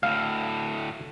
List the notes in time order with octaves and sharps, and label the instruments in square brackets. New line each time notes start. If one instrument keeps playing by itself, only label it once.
[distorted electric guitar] D2 A2 [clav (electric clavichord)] F5